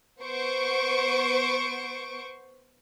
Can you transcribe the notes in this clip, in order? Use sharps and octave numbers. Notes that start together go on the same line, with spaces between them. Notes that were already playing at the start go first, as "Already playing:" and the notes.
B3 C5 C#6 D7